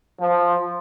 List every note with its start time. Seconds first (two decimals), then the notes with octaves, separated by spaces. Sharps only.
0.20 F3